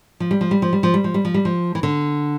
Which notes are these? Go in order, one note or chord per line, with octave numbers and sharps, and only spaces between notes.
F3
G3
F3
G3
F3
G3
F3
G3
F3
G3
F3
G3
F3
E3
D3